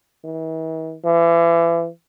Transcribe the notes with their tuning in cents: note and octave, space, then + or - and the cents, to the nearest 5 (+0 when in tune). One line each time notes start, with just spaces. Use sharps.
E3 -45
E3 +35